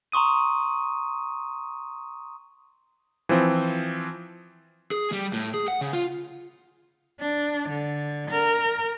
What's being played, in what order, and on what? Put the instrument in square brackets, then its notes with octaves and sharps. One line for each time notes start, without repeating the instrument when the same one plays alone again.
[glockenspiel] A#5 C6 C#6 D#6 D#7
[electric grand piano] E3 F3 C4
[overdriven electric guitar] G#4
G3
A2
G#4
F#5
C#3
F4
[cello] D4
D3
A#4